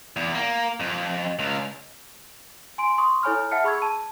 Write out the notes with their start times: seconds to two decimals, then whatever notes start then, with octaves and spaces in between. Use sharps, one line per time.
0.16 E2
0.35 A#3
0.80 F2
1.39 C#2
2.78 G#5 C6 D7
2.98 C6 C#6 D#6
3.23 E4 A4 C#5 G#5 B5 F6
3.51 E5 F#5 A5 F6 C#7
3.64 G#4 B5 C#6 E6 G#6
3.82 A5 D#7